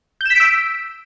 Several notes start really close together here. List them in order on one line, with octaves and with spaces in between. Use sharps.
G6 E7 B6 D7 E6